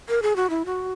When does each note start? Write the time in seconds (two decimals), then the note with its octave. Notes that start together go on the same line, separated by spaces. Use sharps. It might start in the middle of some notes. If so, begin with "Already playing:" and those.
0.09 A#4
0.22 G#4
0.36 F#4
0.50 E4
0.66 F#4